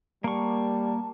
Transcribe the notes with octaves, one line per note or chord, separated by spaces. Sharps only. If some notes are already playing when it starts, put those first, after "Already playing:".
G3 A#3 A5 C#6